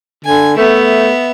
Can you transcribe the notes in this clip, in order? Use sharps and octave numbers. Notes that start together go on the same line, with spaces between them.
D3 G#5
A3 B3 E5